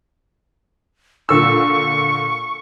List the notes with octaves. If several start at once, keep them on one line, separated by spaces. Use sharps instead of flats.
A#2 D3 C#6 E6